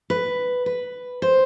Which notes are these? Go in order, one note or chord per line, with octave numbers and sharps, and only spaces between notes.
B4
B4
C5